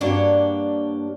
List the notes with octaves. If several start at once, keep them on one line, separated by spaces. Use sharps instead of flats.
G2 A#3 D4 F#4 G4 C#5